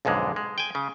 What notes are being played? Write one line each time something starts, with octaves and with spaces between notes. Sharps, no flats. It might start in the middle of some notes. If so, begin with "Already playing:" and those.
B1 F2 G#2 D3 G#3
G#3
G5 G#5
C#3